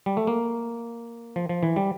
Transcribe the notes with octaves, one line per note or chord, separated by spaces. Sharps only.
G3
A3
A#3
F3
F3
E3
G3